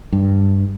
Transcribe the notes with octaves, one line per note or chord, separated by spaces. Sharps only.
G2